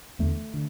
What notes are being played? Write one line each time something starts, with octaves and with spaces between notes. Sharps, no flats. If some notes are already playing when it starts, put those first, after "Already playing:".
E2 D3 A3
D3